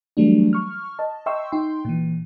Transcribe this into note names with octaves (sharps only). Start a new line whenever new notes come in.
E3 F#3 G3 A3 D4
C#6 F6
D#5 A5
D#5 E5 G5 C6 C#6 E6
D#4 G5 C6
A#2 E3